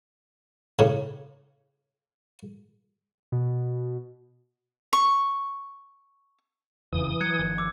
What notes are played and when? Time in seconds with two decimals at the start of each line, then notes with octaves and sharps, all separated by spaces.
0.79 A2 C#3
3.32 B2
4.93 C#6
6.93 E1 F2 C#3 E3 D#6
7.21 F#3 F#6 G#6 C#7
7.39 G1 D#3 F3
7.58 D6 E6